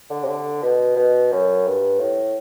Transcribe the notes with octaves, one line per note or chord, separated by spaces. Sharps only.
D3
C3
D3
B2
B2
F#2
G2
A2